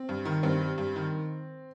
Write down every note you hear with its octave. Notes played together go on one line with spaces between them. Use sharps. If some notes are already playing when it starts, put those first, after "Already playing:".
Already playing: C4
G2
D#3
G2 C4
G3
G2
D#3